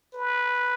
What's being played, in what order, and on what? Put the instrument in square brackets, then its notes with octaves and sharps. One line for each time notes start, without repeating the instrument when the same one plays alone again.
[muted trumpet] B4